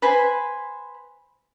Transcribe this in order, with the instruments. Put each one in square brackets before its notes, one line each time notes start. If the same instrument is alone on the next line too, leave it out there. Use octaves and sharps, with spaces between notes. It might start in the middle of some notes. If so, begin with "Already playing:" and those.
[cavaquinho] B4 C5 G#5 B5